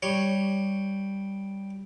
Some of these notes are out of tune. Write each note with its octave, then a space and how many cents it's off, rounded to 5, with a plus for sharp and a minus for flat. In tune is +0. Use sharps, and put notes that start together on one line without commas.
G3 +0 C#5 +0